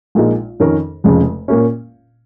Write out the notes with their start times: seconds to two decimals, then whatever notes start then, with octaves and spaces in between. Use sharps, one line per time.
0.15 A#1 A#2 G#3 D#4
0.60 F2 D#3 C#4 A#4
1.04 F1 F2 C#3 F3 G#3
1.48 A#2 A#3 C#4